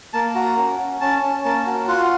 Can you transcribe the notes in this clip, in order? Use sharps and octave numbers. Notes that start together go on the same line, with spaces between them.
A#3 A5
F#4 A#5
C#4
C#4
C#4 A5
C#4
A#3 A5
F#4
F4 F#5